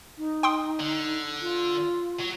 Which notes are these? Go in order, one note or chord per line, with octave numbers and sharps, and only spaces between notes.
D#4
G5 C6 D#6
D3
F4
F#3